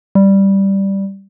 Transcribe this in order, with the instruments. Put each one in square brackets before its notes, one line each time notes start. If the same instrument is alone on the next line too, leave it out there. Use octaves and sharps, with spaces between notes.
[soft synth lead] G3